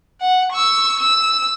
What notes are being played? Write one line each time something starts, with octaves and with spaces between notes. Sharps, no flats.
F#5
C#6 E6
E6